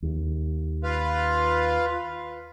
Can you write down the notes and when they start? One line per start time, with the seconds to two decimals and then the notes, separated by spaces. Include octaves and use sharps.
0.02 D#2
0.84 F4 B4 F5